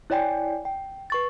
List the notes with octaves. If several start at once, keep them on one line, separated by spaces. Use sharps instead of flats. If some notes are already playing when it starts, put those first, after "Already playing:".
E4 C#5 D5 G5 G#5
G5
B4 C#6 A6